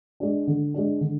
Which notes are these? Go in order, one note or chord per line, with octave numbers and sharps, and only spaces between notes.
G#3 D4
D3
G#3 D4
D3